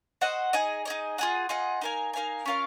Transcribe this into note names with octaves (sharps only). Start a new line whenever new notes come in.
F#4 C5 D#5 F#5
D#4 G#4 D#5
D#4 G#4 D#5
F4 G#4 D#5 F#5
F4 G#4 D#5 F#5
D#4 A#4 F5 G#5
D#4 A#4 F5 G#5
C#4 F4 A#4 F5